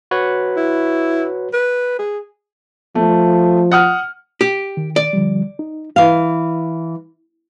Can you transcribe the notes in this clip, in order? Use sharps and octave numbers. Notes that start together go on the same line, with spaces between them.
F#4 B4 C#5
E4
B4
G#4
F3 A3
F#5 D#6 F6
G4
D#3
D5
D3 F3 G3
D#4
E3 F5